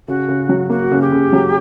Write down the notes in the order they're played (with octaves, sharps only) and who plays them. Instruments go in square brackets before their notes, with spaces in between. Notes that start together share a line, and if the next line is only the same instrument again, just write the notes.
[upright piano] C#3 [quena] F#4
[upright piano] C#3
F#3
[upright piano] A#3 [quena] F#4
[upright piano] C#3
[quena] G4
[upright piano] C#3
F#3